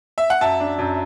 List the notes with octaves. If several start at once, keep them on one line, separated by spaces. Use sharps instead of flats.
E5
F#5
F#2 E5 A5
D4
F#2